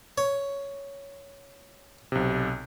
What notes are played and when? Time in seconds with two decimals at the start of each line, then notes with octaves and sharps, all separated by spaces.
0.18 C#5
2.12 B1 C3